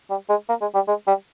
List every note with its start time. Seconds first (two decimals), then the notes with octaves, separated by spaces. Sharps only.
0.10 G3
0.29 G#3
0.49 A#3
0.61 G#3
0.75 G3
0.88 G#3
1.07 G3